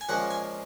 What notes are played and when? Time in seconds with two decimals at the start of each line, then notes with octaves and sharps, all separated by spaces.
0.01 G#5
0.09 A#2 F3 G#3 C#4 F#5
0.31 G#5